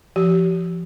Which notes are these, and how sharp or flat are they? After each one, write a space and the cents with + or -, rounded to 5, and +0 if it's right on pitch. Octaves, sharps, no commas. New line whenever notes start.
F3 -25 G4 -30